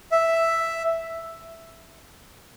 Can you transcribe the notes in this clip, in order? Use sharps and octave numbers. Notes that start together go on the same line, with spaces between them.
E5